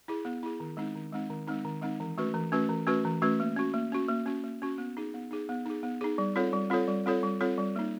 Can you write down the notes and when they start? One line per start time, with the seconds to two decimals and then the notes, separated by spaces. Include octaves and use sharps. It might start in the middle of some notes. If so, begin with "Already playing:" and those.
0.08 E4 G#4
0.25 B3
0.43 E4 G#4
0.60 D#3
0.77 G#3 C4 D#4
0.96 D#3
1.12 G#3 C4 D#4
1.30 D#3
1.48 G#3 C4 D#4
1.65 D#3
1.82 G#3 C4 D#4
2.00 E3
2.18 A3 C#4 F#4 B4
2.34 E3
2.52 A3 C#4 F#4 B4
2.69 E3
2.87 A3 C#4 F#4 B4
3.05 E3
3.22 A3 C#4 F#4 B4
3.40 A#3
3.56 C#4 F#4
3.74 A#3
3.92 C#4 F#4
4.08 A#3
4.26 C#4 F#4
4.44 A#3
4.62 C#4 F#4
4.78 B3
4.97 D#4 G#4
5.14 B3
5.31 D#4 G#4
5.49 B3
5.66 D#4 G#4
5.83 B3
6.01 D#4 G#4
6.18 G3
6.36 C4 F4 A4 C#5
6.53 G3
6.70 C4 F4 A4 C#5
6.88 G3
7.06 C4 F4 A4 C#5
7.23 G3
7.41 C4 F4 A4 C#5
7.58 G3
7.76 A#3 D#4